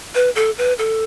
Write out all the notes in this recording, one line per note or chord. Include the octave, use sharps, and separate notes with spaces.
B4
A4
B4
A4